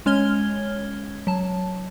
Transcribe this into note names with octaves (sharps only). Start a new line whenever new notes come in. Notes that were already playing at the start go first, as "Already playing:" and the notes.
G#3 C#4 C#5 F6 G#6 G7
F#3 A5